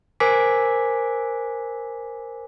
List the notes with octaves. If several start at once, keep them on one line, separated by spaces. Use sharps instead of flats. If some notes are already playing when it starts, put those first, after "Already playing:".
A#4 C5 G#5 D6 B6